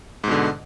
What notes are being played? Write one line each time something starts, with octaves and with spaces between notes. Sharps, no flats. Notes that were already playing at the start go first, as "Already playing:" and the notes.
G#2 B2 D3